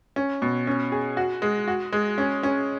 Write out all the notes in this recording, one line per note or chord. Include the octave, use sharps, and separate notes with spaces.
C#4
B2
C#4
G#4
F#4
G#3
F#4
G#3
C#4
C#4